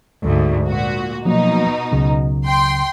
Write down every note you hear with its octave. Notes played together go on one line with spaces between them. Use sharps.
D2 G#2
A#2 F#4
B2 F3 F#3 A#3 D#4
C#2 C#3 F#3
G5 C6